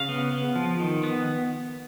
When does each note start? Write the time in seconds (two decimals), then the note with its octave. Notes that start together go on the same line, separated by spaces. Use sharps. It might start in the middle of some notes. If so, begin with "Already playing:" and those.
Already playing: C#3 F5
0.09 B3
0.32 B3
0.56 F3
0.80 D#3
1.03 B3